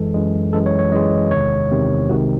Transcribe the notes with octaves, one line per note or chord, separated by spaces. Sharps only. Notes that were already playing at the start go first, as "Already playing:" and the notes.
Already playing: F#2 E3 G#3 A4
F#2 E3 G#3
F#2 E3 G#3 A4
C#5
C#5
F#2 E3 G#3 D#5
E2 C3 D#3 G#3 C#5
E2 C3 D#3 G#3
C2 C3 D#3 G#3 F#4